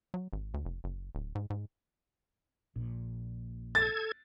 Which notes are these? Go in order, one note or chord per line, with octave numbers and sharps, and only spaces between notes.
F#3
G#1
D2
F1
F#1
D1
G#2
G#2
A#1 A#2
A4 G#6 A6